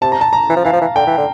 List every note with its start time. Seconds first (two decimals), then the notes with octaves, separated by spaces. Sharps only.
0.02 C3 A5
0.12 A#5
0.21 A5
0.33 A#5
0.49 E3
0.56 F3
0.65 E3 F5
0.73 F3
0.81 E3
0.96 D3 G5
1.06 E3
1.18 D3